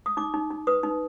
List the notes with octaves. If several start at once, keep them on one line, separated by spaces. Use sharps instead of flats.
D#6
D#4 D6
D#4
D#4
B4 D#6
D#4